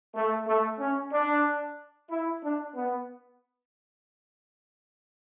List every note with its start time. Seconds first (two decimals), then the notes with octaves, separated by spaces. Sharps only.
0.15 A3
0.46 A3
0.79 C#4
1.11 D4
2.09 E4
2.42 D4
2.75 B3